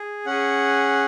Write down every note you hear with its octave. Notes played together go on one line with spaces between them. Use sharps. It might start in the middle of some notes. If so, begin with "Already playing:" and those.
Already playing: G#4
C#4 G#4 F#5